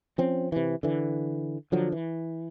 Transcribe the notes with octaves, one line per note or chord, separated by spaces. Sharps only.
F3 C4 C#4
C3 E3
D3 E3
D3 F3 F#3
E3